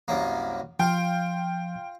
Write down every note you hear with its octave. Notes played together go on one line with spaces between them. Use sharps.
C2 F#2 A#3
F3 F4 G5